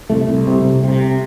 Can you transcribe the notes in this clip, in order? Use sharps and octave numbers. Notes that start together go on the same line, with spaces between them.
C2 A3
C2
C3
C2
C3